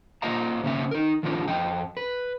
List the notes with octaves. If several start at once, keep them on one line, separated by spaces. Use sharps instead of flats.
A#3 F4 C5 D#5 F5 A#5
C#3 A#3 C4 C#4 E5
D#4 A#4
D#3 F3 G#3 C4 D4 F4
F2 D#5 G5
B4